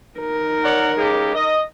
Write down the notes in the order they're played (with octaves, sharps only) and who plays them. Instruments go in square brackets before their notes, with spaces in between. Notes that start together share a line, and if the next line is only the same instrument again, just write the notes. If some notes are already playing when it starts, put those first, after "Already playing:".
[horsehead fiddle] D#4 A#4
[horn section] C#5 D5 F#5
C#3 G#3 G4
D#5